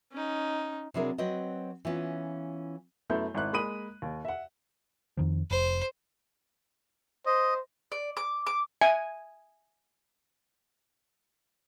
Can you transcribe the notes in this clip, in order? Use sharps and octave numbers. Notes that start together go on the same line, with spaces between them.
C#4 D#4
C3 F#3 D4 E4 G#4 A#4
F#3 C4 B4 D#5
E3 B3 C#4 F4
F#2 A3 B3 E4 G6
G#1 E4 F#6
G#3 A#3 B5 D#6 D#7 F#7
D#2
E5 F#5
F2 D#3 F3
F1 C5
C5 D#5
D5
D6
D6
E5 G#5